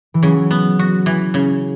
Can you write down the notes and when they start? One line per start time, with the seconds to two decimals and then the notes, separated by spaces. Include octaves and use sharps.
0.14 E3
0.23 C#3 F#3
0.51 B3
0.79 F#4
1.06 E3
1.34 C#3